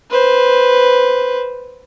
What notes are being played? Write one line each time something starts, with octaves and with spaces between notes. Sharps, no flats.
B4 C5